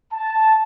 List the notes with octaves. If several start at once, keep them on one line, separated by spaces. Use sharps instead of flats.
A5